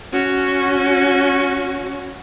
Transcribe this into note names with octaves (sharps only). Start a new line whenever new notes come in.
C#4 F#4